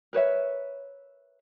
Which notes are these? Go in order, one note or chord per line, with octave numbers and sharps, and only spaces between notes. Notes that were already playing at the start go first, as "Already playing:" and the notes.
A#4 B4 C#5 E5